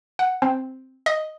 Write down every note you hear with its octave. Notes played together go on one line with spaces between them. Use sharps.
F#5
C4
D#5